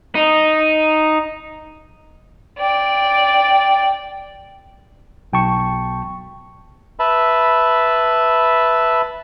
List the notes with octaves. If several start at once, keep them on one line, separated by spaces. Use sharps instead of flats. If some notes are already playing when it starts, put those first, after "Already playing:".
D#4
D5 G5
B1 G5 A5 C#6
B4 E5 A5 B5